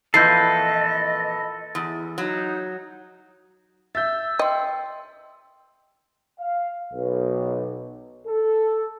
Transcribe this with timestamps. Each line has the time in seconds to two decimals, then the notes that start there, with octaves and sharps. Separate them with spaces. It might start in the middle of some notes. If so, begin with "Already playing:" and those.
0.14 F2 A#2 E3 A4 B4 D#5 G6 C7
1.75 E2
2.18 F#3 D#4
3.95 E5 E6 G6 A6
4.39 D#5 G5 C6
6.40 F5
6.93 B1
8.27 A4